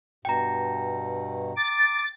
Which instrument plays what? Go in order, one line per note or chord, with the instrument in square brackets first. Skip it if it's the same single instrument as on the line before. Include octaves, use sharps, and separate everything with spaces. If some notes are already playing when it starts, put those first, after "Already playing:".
[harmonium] G2 B2 [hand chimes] G5 A#5
[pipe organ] D6 [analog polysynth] A6